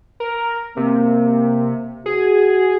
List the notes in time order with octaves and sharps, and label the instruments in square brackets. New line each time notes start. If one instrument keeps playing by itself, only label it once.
[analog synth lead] A#4
[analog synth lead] C3 [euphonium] A#3
[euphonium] F#4 [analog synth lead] G#4